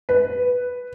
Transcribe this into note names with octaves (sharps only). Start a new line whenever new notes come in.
B4